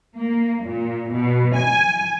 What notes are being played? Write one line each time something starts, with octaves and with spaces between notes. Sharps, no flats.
A#3
A#2
B2
G#5